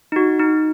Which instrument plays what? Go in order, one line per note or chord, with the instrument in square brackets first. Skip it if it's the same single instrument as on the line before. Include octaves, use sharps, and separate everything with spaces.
[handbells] D#4
F#4
D#4